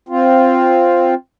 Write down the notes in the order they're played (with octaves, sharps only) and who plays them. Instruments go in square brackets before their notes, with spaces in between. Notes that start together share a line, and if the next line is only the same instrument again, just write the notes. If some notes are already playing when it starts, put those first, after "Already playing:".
[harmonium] C4 F4